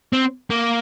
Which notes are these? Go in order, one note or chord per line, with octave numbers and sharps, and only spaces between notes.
C4
A#3